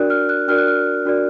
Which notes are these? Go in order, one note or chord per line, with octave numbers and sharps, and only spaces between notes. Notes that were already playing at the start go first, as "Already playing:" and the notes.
Already playing: D4 F#4 A#4 D5 F#6
F6
F#6
D4 F#4 A#4 D5 F6
F#6
F6
D4 F#4 A#4 D5